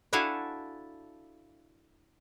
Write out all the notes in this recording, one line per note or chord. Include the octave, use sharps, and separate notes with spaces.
D4 E4 F#4 A4 F5 G#5